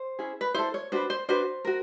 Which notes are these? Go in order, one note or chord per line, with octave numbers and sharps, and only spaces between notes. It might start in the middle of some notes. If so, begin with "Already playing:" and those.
Already playing: C5
C#4 E4 G#4
B4
E4 A4 C5
C#5
D4 F#4 B4 C5
C5
D4 F#4 B4 C5
F#4 A#4